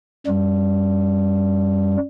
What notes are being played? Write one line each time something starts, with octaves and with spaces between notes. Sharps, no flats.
F#2 G3